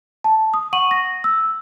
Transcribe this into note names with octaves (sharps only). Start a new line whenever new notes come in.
A5
D#6
F#5 C#6 D#7 F#7
A#6
E6